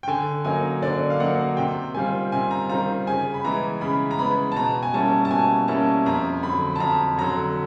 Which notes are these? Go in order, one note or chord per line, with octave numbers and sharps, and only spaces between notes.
G5
D3 G#5
F#3 A#3 D#4 G#5
D3 D5
F5
F#3 A#3 D#4 F#5
C3 G5
D#3 G3 C4 F4 G#5
C3 G#5
A#5
D#3 G3 C4 F4 A#5
C#3 G#5
B5
E3 G#3 B3 A#5
C#3 B5
A#5
E3 G#3 B3 B5
A5
B2 A#5
G#5
G3 A#3 C#4 E4 A5
A5
B2 G#5
G3 A#3 C#4 E4 A5
F2 A#5
D3 F#3 B5
A5
F2 A#5
D3 F#3 A#5